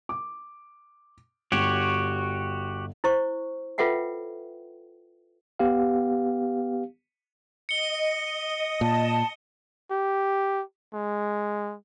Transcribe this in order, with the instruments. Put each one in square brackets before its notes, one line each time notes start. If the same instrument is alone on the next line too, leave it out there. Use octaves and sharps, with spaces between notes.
[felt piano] D6
[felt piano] G1 [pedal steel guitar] F#4 G4 C#5
[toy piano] E4 C5 C#6
F4 A4 B4 E5 F#5 G5
[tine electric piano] B3 G4 F5
[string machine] D#5 [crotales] C#7 G7
[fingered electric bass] A#2 [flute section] A5
[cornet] G4
G#3